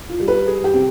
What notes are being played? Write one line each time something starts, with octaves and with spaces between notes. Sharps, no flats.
F4
G3
B4
G3 G#4
G4
C3